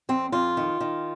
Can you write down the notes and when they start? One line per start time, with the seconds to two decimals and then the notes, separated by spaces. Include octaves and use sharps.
0.09 F2 C4
0.32 F2 F4
0.57 D#3
0.80 D#3